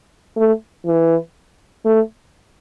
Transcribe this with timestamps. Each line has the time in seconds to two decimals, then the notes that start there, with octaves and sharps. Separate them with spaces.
0.36 A3
0.86 E3
1.85 A3